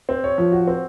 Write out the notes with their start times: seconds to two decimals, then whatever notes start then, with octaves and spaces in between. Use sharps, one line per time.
0.09 C4
0.24 C#5
0.38 F3
0.52 F#4
0.67 C4